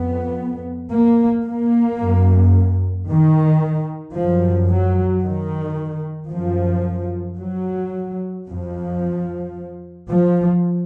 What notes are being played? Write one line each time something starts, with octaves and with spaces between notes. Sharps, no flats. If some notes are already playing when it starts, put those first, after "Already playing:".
Already playing: F2 B3
A#3
A#3
F#2
D#3
F#2 F3
F#3
D#3
F#2 F3
F#3
F2 F3
F3